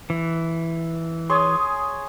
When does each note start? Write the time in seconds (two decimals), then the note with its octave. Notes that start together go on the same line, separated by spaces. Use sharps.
0.10 E3
1.30 G#4 C#5 C6 D#6